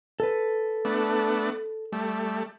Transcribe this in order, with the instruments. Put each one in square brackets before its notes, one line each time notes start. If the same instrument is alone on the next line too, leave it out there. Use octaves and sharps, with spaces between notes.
[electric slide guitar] A4 B4
[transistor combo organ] A3 B3 D4
G3 A3